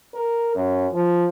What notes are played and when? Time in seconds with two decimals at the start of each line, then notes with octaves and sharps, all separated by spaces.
0.14 A#4
0.55 F#2
0.92 F3